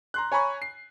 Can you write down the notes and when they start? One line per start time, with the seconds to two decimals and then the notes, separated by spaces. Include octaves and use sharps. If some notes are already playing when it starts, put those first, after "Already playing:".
0.14 A#5 C6 F#6
0.32 C#5 G#5 A#5 B5 C#6
0.62 C7